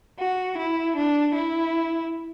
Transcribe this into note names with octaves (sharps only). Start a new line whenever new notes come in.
F#4
E4
D4
E4